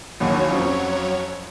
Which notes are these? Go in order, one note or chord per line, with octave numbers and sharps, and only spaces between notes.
A#1 D#2 F#3 C#5
F2 F3 C#4